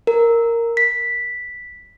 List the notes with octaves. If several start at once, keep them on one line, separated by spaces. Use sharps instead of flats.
A#4
B6